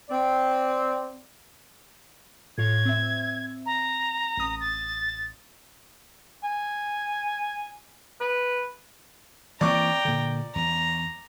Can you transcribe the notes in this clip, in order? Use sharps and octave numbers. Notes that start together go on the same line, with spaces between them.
C4 D5
A2 F4 C#5 G#6
C4 E5
A#5
A1 D#6
A6
G#5
B4
E3 A#3 C4 D5 G5 A#5 C#6 D6
A#2 D3
E2 A#5